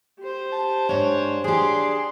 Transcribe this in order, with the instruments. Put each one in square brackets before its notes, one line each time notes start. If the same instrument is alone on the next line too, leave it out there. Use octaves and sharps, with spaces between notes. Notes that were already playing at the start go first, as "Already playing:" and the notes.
[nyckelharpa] G4 C5
[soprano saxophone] A5
[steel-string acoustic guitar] G#2 D4 [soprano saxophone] C#5
[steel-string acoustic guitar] D4 G4 [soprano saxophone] G#4 [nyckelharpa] C6